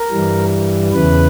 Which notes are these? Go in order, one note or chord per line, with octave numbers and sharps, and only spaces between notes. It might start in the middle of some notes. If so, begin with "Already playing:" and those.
Already playing: A#4
G2 E3 G3
E2 C#3 E3 B4